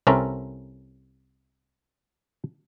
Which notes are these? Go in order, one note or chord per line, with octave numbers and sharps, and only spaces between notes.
C2 C4 C#4 A4 A#4 E5